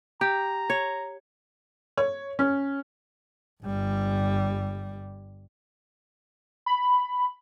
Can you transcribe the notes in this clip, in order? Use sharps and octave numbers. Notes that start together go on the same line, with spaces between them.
G4 A#5
C#5
C#5
C#4
G1 G3
B5